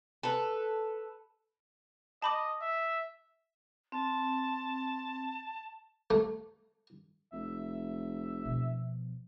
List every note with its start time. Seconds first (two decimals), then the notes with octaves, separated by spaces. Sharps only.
0.23 A4 B4
2.22 D#5 A5 B5 D6
2.61 E5
3.92 C4 A5
6.10 A3
7.33 F1 E5
8.45 B2 F3